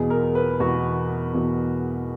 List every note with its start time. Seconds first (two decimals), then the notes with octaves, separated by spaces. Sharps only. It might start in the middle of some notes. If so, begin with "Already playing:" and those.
Already playing: E2 B2 G#4
0.10 A#4
0.35 B4
0.60 E2 B2 F#4
1.34 E2 B2